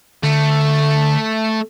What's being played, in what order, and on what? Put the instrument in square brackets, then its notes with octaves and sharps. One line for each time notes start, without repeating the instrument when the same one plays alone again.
[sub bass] D3 [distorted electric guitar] A3